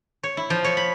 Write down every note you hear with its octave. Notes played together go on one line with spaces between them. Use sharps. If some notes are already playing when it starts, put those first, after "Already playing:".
C#5
E4
F3
C#5
B5